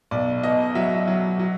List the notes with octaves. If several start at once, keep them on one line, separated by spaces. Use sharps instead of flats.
B1 D5
B2 D#5
F#3 E5
F#3
F#3